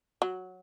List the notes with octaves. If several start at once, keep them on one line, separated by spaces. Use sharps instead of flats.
F#3